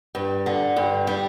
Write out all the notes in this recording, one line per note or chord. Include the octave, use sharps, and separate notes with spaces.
G2
D3
G2
G3